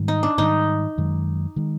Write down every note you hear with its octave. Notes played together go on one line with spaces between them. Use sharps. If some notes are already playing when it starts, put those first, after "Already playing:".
Already playing: G#2 D#3 G3
D#4
D4
G#2 D#3 G3 D#4
F#2 D#3 G#3
D#3 G#3